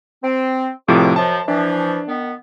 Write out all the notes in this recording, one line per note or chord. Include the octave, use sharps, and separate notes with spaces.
C4
C#2 A2 C3 F3 D6
F#2 F3 A5
E3 F3 D4
D#3 B3